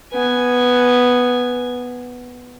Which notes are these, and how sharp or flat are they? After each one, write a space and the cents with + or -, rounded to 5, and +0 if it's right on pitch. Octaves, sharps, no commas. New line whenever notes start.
B3 +0 G#5 +0